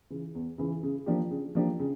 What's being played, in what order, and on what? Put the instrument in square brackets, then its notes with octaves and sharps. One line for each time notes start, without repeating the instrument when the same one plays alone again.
[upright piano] C#3 E3
E2
C#3 E3
C#3
F3 A#3 D4 G4
C#3
F3 A#3 D4 G4
C#3